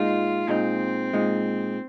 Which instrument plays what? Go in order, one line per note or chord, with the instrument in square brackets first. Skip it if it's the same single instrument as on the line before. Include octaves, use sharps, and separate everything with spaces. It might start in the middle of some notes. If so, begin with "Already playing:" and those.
Already playing: [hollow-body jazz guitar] A#2 G#3 D#4 [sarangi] F4
[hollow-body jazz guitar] A#2 G#3 D#4 [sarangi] C4
[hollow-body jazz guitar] A#2 G#3 D#4